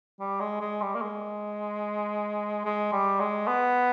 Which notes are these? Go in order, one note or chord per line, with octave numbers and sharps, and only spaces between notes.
G3
G#3
G#3
G3
A#3
G#3
G#3
G3
G#3
B3